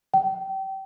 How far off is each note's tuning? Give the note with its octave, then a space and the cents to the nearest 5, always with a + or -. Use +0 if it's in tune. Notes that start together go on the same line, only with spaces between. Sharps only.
G5 -25